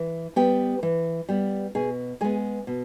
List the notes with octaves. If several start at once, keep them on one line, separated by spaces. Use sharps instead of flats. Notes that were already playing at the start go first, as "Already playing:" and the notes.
Already playing: E3
G3 B3 G4 G5
E3
G3 B3
B2 G#4 G#5
G#3 B3 G#4 G#5
B2